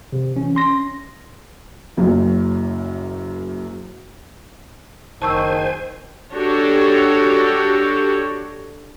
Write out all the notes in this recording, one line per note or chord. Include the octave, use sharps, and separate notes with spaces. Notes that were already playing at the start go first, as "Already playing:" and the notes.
C3
E3 C#4
C#4 C6 A#6
F#1 F#2
F#1 D#3 C5 G#5 A5 C#6 E6
D4 F#4 G4 A4 C#5